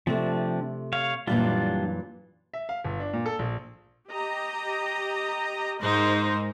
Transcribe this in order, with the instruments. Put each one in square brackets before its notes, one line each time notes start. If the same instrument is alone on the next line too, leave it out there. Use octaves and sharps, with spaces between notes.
[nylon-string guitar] C3 A3 [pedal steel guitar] F3 C4 D4
[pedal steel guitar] C#5 F5
[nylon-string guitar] F#2 A#2 E3 [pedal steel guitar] G3 D4 F4
[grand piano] E5
F5
G1
D4
A#2
A4
A#1
[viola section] G4 D#5 A#5
[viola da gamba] G#2 G#3 [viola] D#4 [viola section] A#4 C5 C6